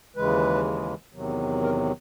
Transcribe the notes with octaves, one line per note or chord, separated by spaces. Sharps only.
D#2 C#3 E3 G#3 B4
E2 C3 D#3 F#3
A#4